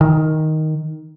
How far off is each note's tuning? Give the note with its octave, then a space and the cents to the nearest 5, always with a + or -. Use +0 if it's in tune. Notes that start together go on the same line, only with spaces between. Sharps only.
D#3 +5